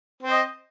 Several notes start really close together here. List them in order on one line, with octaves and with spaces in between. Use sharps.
C4 C5 D#5